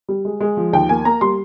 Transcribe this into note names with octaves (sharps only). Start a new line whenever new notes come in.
G3
G#3
G#3
F3
D#2 G5
A#3 G#5
A#3 A#5
G3 C6